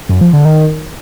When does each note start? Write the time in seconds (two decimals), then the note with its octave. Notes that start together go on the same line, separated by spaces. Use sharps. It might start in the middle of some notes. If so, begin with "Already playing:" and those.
0.09 F#2
0.21 F3
0.33 D3
0.45 D#3